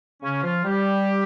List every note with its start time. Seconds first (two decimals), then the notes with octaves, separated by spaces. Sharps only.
0.22 C#3 C#4
0.43 F3 F4
0.64 G3 G4